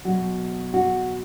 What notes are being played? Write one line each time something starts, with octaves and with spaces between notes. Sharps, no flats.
B2 F#3 F#4
F#4